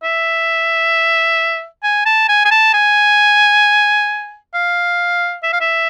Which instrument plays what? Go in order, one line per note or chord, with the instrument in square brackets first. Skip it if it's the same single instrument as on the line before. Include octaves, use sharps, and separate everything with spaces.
[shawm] E5
G#5
A5
G#5
G#5
A5
G#5
F5
E5
F5
E5